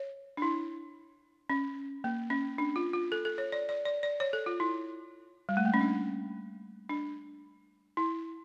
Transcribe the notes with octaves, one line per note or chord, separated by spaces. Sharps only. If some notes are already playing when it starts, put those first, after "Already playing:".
Already playing: C#5
D4
E4
C#4
A#3
C#4
D4
F4
F4
A4
A4
C#5
D5
D5
D5
D5
C#5
A4
F4
E4
G3
A3
A#3
C#4
D4
D4
E4